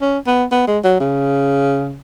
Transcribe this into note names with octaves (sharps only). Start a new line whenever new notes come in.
C#4
B3
B3
G#3
F#3
C#3